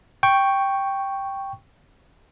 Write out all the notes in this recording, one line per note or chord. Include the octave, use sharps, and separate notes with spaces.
G5 C#6